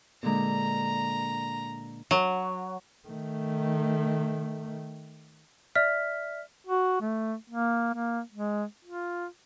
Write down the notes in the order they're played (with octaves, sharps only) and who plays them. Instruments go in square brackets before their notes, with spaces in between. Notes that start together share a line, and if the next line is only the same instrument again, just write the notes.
[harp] A#2 D3 G#3 [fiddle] A#5
[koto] F#3
[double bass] D#3 A3
[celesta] D5 E5 F6 B6
[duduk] F#4
A3
A#3
A#3
G#3
F4